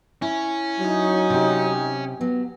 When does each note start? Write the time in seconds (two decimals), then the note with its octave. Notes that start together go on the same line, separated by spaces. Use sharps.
0.22 C#4 E4
0.80 F#3 D#4
1.30 C3 G4
2.21 F#3 B3